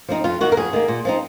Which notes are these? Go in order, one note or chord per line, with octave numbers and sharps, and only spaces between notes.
F3 C4 D#4
F2 F4
D#3 A#3 F#4
A#4
F2 G#4
D#3 A#3
A#2
F3 C4 D#4